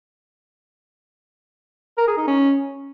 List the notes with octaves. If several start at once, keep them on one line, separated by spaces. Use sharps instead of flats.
A#4
G#4
D#4
C#4